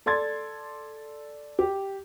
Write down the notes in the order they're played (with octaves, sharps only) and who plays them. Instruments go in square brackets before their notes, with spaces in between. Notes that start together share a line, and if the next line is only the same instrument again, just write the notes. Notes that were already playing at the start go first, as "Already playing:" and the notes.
[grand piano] A4 D5 C6 G#6 A6
G4